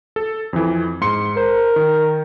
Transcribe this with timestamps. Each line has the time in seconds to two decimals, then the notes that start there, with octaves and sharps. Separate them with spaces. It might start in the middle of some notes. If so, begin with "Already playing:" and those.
0.16 A4
0.53 F2 E3
1.01 G#2 C6 C#7
1.37 A#4 C5
1.76 D#3